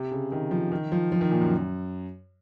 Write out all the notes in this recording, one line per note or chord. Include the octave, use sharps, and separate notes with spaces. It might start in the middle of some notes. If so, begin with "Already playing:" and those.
Already playing: C3
C#3
D#3
F3
D#3
F3
F3
D#3
A#2
F#2